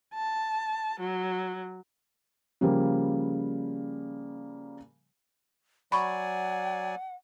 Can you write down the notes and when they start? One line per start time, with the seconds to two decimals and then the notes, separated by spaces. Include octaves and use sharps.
0.15 A5
1.00 F#3
2.61 C#3 F3 G3 A#3
5.92 F#3 D5 F#5 G#5 B5 C#6